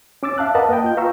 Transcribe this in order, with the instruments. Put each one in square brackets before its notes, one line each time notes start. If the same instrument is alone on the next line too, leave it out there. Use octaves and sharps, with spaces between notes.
[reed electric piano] C#4 D6 E6 A6
E5 F5 A5 F#6
A#4 B4 D#5 F5 F#5 A5
A#3 D#5 G5
F4 G6
B4 F5 A#5 C#6 E6